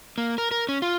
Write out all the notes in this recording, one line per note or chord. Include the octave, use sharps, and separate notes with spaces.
A#3
A#4
A#4
C#4
F4